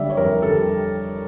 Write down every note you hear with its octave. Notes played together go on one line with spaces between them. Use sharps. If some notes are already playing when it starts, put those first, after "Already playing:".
Already playing: D3 G3 D5 E5
C#5
F2 A#4
D3 G3 A4